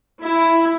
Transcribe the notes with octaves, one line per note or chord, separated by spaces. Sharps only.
E4